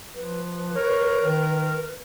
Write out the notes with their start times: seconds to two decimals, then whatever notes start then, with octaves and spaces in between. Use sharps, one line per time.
0.15 F3 B4
0.75 A#4 C#5
1.24 D#3